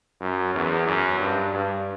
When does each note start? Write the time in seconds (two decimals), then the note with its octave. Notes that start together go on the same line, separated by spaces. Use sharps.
0.21 F#2
0.55 E2
0.87 F#2
1.20 G2
1.54 G2